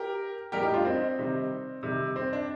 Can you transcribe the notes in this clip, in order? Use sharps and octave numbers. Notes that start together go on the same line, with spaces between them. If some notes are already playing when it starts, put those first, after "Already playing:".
Already playing: G4 A#4
A2 G3 G4 A#4
D#4 G4
D4 F4
C4 D#4
C3 D#3 G3
C3 D#3 G3
C4
D4